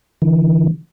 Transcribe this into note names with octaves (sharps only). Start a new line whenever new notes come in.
D3 E3